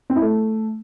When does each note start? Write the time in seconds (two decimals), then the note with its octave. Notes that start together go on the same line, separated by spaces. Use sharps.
0.10 C4
0.16 E4
0.22 A3